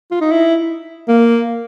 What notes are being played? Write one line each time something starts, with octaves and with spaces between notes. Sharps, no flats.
F4
D#4
E4
A#3